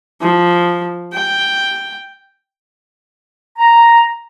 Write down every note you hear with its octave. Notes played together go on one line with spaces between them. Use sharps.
F3
G5
A#5